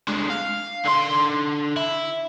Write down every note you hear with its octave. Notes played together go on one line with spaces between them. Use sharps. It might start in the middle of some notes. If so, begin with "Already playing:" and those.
D3 G#3
F5
D3 C6
E4